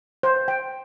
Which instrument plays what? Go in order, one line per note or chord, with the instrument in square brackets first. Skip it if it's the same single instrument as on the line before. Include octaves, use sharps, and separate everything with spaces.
[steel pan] C5
G5